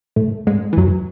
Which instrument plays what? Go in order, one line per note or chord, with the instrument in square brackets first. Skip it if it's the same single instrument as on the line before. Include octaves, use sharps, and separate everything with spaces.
[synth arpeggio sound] A2 A3
G#2 G#3
E3
F#2 F#3